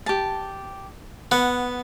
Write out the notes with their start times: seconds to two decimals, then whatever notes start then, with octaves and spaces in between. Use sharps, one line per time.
0.06 G4 A5
1.32 B3 F#5